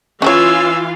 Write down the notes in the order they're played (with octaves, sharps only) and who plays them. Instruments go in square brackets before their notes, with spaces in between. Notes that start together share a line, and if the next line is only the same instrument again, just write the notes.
[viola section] E3 F4 F5 [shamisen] C#4 E4 C#5 [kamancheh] G#5 E6